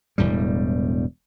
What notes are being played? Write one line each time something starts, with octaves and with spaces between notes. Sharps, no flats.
E1 E2 A2 G3